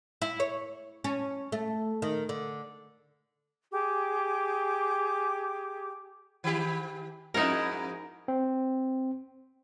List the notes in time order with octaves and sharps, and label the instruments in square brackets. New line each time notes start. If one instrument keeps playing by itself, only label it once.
[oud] E4
C#5
C#4
A3
D#3
D3
[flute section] G4 G#4 D6
[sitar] D#3 G4
[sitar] F2 G#2 E4 [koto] D#4 A#4
[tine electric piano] C4